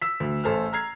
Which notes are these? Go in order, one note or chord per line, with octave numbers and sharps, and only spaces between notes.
E6 B6
D2
A1 A4 C5 G#5 F6
A#5 F6 G#6 C7